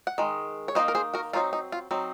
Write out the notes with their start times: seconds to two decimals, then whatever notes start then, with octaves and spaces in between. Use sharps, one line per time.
0.07 F#5
0.18 D#3 G#3
0.68 C#5
0.75 D#3 A#3 D#4 C5 D#5
0.88 A#4
0.95 G#4 C5
1.14 F#4 A#4
1.33 F#3 C4 D#4 F4
1.53 D#4
1.72 F4
1.91 F#3 C4 D#4